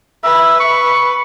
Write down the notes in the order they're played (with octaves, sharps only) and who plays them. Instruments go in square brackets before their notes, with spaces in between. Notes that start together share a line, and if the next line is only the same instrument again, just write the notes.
[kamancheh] B4 [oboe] E5
[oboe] C#6